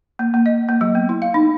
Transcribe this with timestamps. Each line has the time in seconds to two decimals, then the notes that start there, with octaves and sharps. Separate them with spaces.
0.19 A#3
0.34 A#3
0.46 D#5
0.69 A#3
0.81 F#3
0.95 B3
1.09 E4
1.22 F5
1.34 D#4